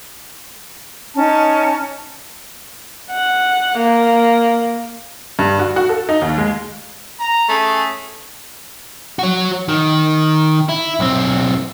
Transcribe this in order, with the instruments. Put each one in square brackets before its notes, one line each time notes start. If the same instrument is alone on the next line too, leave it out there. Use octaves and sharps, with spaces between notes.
[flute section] C#4 D#4 A5
[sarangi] F#5
A#3
[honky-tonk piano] G2
F#4
F#4
A4
D#4
D#2
G#3
[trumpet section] A#5
[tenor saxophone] A3 [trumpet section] C#4 G#4
[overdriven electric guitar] F#4 C#5
D#3
E4
B1 C4